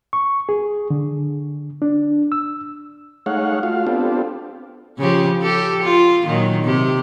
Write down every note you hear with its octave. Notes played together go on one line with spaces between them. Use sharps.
C#6
G#4
D3
D4
E6
G#3 A3 D#4 C#5 F5 F#5
A3 F4 F#4 F5
B3 C4 D4 F4 G4 A4
C#3 F3 G4
G4 A4
F4
A#2 D#3 F#3
C3 G4